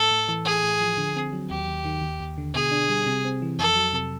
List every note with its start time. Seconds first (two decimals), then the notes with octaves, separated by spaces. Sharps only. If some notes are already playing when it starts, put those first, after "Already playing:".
Already playing: A2 A4
0.11 A2
0.28 E3
0.45 A2 G#4
0.63 A2
0.81 F3
0.97 D3
1.16 C4
1.32 F#3
1.50 D#2 G4
1.68 D#2
1.85 D#3
2.02 D#2
2.20 D#2
2.38 D3
2.54 B2 G#4
2.72 D4
2.89 G3
3.07 C3
3.25 C4
3.42 E3
3.58 F2 A4
3.76 F#3
3.93 C3